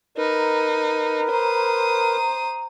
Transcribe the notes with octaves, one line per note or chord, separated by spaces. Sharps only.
D#4 A#4 B4
C5 A#5 D#6